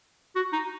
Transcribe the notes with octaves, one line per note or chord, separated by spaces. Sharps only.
F#4
D#4